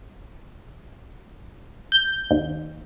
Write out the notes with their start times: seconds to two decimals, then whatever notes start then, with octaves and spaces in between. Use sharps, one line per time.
1.92 G6
2.31 D#2